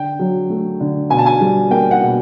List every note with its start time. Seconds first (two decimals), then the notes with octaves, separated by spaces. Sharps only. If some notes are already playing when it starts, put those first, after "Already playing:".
Already playing: D3 G5
0.19 F#3
0.50 A3
0.80 D3
1.10 B2 G#5
1.18 A5
1.26 G#5
1.41 G3
1.71 A#3 G5
1.91 F#5
2.01 B2